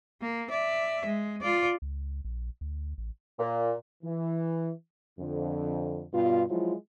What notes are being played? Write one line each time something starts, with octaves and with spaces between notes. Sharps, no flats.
A#3
D5 E5
G#3
F4 D5
C#2
A#1
D2
A1
A#2
E3
F2 D3
G2 B2 F4
F3 F#3 G#3 E4 F4